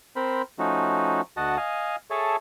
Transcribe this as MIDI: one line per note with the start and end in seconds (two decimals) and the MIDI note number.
0.16 0.42 60
0.16 0.42 70
0.16 0.42 72
0.16 0.42 83
0.59 1.21 53
0.59 1.21 57
0.59 1.21 61
0.59 1.21 63
0.59 1.21 66
1.37 1.57 38
1.37 1.57 66
1.37 1.57 75
1.37 1.57 78
1.37 1.57 81
1.57 1.96 75
1.57 1.96 77
1.57 1.96 80
2.10 2.36 68
2.10 2.36 69
2.10 2.36 73
2.10 2.36 76
2.10 2.36 81